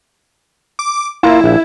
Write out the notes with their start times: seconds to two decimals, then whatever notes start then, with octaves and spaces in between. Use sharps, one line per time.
0.79 D6
1.23 A#3 E4 F4
1.44 A#1